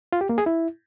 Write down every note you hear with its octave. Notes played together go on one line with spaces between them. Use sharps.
F4
G4
A#3
G#4
E4